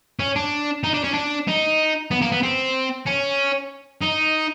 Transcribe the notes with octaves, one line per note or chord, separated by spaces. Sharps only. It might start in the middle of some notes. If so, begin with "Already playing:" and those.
C#4
D4
D#4
D4
C#4
D4
D#4
B3
A#3
B3
C4
C#4
D#4